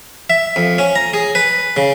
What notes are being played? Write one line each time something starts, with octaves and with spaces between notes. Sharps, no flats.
E5
F2
C#4
A#5
G#4
B4
C#3